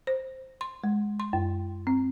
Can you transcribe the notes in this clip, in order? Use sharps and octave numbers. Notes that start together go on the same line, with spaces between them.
C5
C6
G#3
C6
F#2
C4